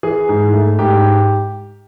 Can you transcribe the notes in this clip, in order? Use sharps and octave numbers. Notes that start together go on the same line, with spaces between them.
E3 G#4
G#2
A3
G#2 G4